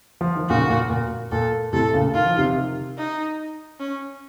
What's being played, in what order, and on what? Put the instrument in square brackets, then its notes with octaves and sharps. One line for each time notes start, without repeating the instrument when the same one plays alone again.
[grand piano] F3
D#3
[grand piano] A#2 C#3 [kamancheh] F#4
[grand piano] A#2
A#2
[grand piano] A#2 [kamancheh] A4
[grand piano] A2 C3 [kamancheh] A4
[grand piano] A#2 C#3
[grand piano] D#3 [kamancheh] F4
[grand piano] F3
C3 D#3
[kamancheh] D#4
C#4